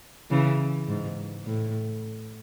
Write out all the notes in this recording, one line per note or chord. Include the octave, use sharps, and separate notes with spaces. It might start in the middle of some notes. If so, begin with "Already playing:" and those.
C#3 E3
G#2
A2